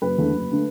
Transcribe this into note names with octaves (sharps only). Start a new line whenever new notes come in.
F#1 B4
E2 D3 A3
F#1
D3 A3